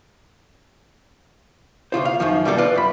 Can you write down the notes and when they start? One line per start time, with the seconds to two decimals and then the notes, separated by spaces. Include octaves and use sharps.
1.92 D2 B2 F4 C5
2.05 F5
2.20 F#2 D#3 F3
2.45 G3 A#3 D4 G4 A4
2.58 F4 B4 D5
2.75 F#2 B5